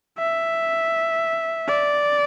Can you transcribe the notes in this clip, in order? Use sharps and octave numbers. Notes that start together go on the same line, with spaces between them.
E5
D5